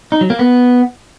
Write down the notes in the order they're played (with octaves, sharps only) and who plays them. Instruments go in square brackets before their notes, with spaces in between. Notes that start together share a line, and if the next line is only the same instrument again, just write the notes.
[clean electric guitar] D#4
F#3
A#3
B3